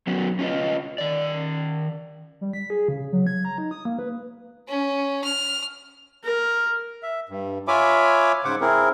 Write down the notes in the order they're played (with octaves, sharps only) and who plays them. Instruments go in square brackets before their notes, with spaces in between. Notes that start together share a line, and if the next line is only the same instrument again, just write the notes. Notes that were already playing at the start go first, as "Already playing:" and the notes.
[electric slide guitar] F#3 B3 C#4 F#4
C#4 F4 B4 D#5
D#3 D5
[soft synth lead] G3
B6
G#4
C#3
F#3
G#6
A#5
D#4
D#6
A#3
B4
[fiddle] C#4
F6
[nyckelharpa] A#4
[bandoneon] E5
G2
F4 C#5 E5 G#5 B5 D6
G#2 C#3 C5 F#5 D6
C4 E4 G#4 A#4